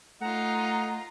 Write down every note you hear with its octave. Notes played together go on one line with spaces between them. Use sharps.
A3 D#4 F4 F#5 A#5